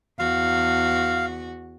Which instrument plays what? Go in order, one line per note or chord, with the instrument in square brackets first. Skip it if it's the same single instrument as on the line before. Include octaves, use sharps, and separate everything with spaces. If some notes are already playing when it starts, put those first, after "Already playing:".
[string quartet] E2 F#4 [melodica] F5